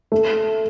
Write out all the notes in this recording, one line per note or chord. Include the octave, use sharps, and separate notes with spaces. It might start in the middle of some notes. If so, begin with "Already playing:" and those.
A3